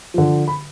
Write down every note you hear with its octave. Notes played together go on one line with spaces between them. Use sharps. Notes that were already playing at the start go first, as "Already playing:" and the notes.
D3 F3
B5